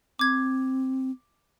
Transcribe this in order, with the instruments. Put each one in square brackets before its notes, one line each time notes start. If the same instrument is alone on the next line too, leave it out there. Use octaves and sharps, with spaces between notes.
[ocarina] C4 [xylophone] D6 G#6